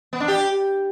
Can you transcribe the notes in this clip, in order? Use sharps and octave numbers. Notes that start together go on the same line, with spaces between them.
B3
D4
G4